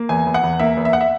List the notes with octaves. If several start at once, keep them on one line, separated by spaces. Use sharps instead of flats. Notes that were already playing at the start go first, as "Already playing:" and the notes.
Already playing: A#3
E2 G#5
E2
F#5
E2
A#3 E5
E2
E5
F#5
E5